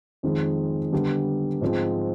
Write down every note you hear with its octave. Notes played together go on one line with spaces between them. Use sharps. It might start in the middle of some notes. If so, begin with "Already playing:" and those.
F2 D#3 G#3
D3 G3 B3
G#2 F3 G#3 C4